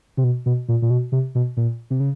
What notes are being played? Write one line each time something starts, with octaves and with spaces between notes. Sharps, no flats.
C3
B2
B2
A#2
A#2
B2
C3
B2
A#2
C3
C#3